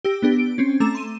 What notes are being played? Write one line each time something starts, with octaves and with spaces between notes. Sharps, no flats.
G4 E6 A#6 D7
B3 D4 G4
D7
C4 C#4
A3 A#5 D6 E7
C6 D#7